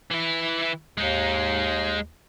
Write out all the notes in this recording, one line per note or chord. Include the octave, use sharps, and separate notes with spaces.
E3 E4
D#2 G#3 D#4